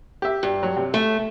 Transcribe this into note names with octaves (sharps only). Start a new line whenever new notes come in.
G4 E5
G2
F#3
C3
A3